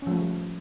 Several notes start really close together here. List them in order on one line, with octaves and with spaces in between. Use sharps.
C#4 F3 A3 G3